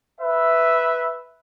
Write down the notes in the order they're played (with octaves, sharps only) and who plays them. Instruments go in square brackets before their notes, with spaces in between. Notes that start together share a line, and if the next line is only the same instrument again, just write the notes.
[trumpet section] B4 E5